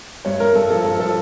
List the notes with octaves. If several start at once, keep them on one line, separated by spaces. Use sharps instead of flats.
G2 C#5
G2 A#4
G2 A4
F3 A4
G2 A4
F3 A4